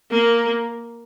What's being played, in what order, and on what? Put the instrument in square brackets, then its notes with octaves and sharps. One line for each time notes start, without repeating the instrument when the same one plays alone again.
[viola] A#3